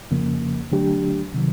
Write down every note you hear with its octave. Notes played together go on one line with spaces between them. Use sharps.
F2 C#3 F3 A#3
D3 F#3 A3 D4 G4
C3 D#3 F#3